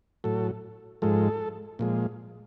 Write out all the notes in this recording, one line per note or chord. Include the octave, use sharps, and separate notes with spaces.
A2 F#3 A4
G#2 F3 G#3 A4
A#2 F3 G#3